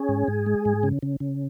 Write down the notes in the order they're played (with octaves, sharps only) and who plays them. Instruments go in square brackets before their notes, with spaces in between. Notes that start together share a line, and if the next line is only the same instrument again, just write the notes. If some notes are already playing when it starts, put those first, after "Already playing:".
Already playing: [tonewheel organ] C#4 G#4
G#2
G#2
G#3
G#2
C#3
C#3
C#3